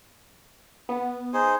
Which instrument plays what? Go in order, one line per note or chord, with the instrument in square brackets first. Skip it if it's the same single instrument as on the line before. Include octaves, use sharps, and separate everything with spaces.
[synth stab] B3
[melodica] D#4 G#4 C5